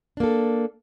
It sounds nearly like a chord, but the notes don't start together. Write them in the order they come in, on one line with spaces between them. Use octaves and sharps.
D4 A#3 A4